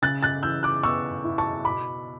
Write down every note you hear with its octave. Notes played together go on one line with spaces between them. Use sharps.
C#3 F#6 A6
F#6 A6
E3 E6 G6
D6 F#6
B3 C#6 E6
E4
A5 C#6
B2 B5 D6